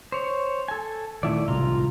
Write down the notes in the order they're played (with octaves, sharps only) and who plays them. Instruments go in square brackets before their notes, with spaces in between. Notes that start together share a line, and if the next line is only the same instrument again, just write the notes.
[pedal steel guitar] C5 C#5
A4 G#5
[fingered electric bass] A#2 D#3 [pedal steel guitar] A3 E4 D5
[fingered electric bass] A1 C3 G3 [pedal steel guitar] F4 A#5 C6